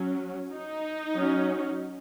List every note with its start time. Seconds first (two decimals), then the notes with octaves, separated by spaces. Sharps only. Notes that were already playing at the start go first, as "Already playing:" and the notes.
Already playing: F#3 C#4
0.52 D#4
1.17 F#3 C#4